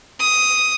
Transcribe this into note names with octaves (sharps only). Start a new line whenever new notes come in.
D#6